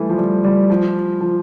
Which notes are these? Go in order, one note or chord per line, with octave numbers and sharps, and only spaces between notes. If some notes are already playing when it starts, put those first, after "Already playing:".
Already playing: E3 G3 A3
F3
G3
G3
F3
F3